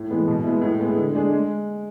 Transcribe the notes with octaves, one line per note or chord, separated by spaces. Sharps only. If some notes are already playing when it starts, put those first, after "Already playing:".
Already playing: A2
E3 G#3 B3
B2
G#3 B3 E4
A2
G#3 B3 E4 G#4
D3
G#3 D4 G#4
G#3